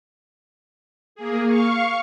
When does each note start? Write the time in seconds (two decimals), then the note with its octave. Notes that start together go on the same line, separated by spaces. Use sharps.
1.15 A#3 G#4
1.47 F5 C#6